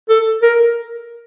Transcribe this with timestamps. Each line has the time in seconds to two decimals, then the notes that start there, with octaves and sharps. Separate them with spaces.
0.09 A4
0.42 A#4